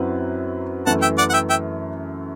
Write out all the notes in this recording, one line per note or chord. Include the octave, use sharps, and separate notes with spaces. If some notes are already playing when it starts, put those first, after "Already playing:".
Already playing: F#2 F#3 C4 E4 B4
F#2 E3 A3 F#5 A5
E5 G5
D5 F#5
F#5
E5 G5
E5 G5